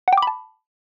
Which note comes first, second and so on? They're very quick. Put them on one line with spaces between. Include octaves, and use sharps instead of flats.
F#5 G5 D6 B5 A5